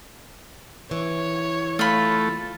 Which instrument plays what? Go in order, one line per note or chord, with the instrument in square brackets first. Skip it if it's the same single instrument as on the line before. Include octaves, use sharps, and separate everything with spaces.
[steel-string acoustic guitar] E3 [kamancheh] C#5
[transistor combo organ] A3 [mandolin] F4 B5